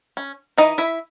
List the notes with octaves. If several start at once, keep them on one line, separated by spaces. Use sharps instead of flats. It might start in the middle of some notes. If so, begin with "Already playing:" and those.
C#4
E3 D#4 D#5
E4 E5